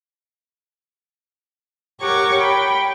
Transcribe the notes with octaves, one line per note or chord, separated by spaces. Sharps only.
G4 A#4 C#5 F#5 C#6 D6
G5 B5